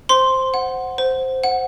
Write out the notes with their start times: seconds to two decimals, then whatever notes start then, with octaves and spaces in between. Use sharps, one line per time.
0.09 C5 C6
0.54 F#5
0.98 C5
1.44 F#5